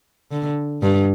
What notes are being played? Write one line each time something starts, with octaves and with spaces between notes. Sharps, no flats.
D3
G2